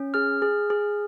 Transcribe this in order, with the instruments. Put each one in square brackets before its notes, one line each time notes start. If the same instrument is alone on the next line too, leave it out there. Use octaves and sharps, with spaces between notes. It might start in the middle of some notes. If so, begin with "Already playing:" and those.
Already playing: [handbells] C#4
G#4 F6
G#4
G#4